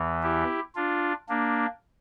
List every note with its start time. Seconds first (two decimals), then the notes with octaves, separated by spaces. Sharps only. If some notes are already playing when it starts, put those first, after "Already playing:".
Already playing: E2 E3
0.23 E4 G4
0.75 D4 F4
1.29 A#3 D4